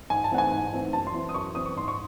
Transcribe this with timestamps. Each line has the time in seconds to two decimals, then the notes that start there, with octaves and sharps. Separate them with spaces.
0.10 G#2 G#5
0.24 A5
0.31 E3 A3 C4 F#5
0.38 G#5
0.52 G#2
0.73 E3 A3 C4
0.93 F#2 A5
1.07 C6
1.14 E3 C4 E4
1.29 D#6
1.34 F#2 C#6
1.55 E3 C4 E4 D#6
1.66 C#6
1.76 G#2 C6
1.88 C#6